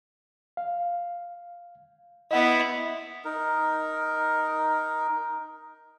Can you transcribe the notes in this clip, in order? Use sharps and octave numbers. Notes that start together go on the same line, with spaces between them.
F5
B3 E4 D#5 F#5
D#4 A#4